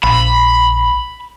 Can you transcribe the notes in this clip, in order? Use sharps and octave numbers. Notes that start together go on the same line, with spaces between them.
A#1 B5